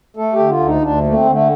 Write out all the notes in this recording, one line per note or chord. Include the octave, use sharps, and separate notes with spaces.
A3 A4
G4
D3
F4
D2
D#4
D2 D4
A3 A#3
C4
D3
A3